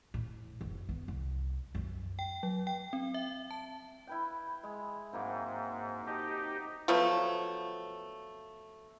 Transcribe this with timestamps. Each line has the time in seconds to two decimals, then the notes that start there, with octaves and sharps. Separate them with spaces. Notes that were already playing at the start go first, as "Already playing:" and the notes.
0.14 A2
0.61 F#1
0.89 B3
1.08 C2
1.75 F#2
2.19 G5
2.43 F#3
2.67 G5
2.93 C4
3.14 E5
3.51 A5
4.07 E4 B4 G5
4.64 G#3
5.13 G#2 F#3 A#3 C4
6.06 D#4 G4 D#5 A5 A#5
6.88 F3 F#3 A3 B3